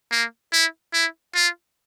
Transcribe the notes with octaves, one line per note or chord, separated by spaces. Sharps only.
A#3
E4
E4
F4